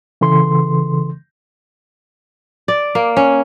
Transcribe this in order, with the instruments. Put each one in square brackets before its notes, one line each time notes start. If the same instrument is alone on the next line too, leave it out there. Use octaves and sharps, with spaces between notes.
[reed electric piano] C#3 E3 A4 C6
[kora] D5
A#3
C#4